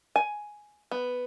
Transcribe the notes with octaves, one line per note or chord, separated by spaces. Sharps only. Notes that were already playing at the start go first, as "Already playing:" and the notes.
G#5
B3